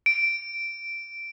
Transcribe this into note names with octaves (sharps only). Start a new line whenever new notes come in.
D7